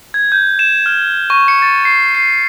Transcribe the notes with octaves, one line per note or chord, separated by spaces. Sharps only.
G#6
G6
E7
F6
C#6
C#7
A6
C7
C7